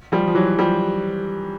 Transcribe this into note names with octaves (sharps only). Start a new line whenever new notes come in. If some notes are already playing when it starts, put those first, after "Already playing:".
F3 G3
F3
E3 F#3
F3 G3